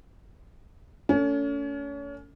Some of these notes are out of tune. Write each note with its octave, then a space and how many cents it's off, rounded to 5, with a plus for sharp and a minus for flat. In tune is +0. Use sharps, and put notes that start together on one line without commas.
A3 +30 C#4 +35